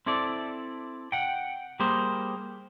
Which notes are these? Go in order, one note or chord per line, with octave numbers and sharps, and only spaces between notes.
C4 E4 A4 D5
F#5 G5
G3 A#3 G#4 C5